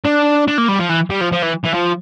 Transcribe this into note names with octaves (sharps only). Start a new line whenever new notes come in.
D4
D4
A#3
G3
F3
E3
G3
F3
F3
E3
E3
F3